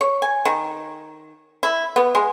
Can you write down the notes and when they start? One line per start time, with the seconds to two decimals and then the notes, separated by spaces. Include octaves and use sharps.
0.01 C#5
0.22 G#5
0.45 D#3
1.63 E4
1.96 B3
2.15 G#3